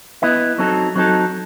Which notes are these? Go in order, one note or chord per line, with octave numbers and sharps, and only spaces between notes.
B3 E4 B4 D#5
F#3 C4 D#4 A4
F#3 C4 D#4 A4